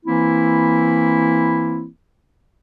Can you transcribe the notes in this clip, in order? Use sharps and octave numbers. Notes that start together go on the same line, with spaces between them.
E3 A#3 C4 E4